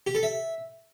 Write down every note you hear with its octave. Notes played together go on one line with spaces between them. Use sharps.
G4
A4
E5